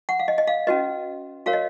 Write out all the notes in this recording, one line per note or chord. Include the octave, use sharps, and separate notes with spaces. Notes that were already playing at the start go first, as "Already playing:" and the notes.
F#5
F5
D#5
D#5
F5
C#4 F#4 B4 D#5
F#4 A#4 C#5 F5
D#5